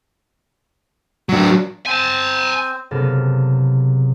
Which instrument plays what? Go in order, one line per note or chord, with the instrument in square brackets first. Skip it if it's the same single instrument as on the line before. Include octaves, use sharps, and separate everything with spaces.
[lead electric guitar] F#3 D4 [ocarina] F#4
[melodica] C4 C5 [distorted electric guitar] G#5 A5
[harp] F#1 C3 B3 A4 F6 A6